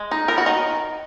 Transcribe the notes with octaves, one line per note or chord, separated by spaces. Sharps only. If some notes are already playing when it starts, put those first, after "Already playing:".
Already playing: G#3
D#4
B3 A#4
F#4
D#3 D#4